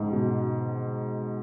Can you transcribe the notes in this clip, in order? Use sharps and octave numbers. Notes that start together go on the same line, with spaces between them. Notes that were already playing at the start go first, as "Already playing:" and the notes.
Already playing: G#2
B2